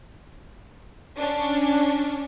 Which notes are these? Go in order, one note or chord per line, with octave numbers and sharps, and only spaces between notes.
C#4 D4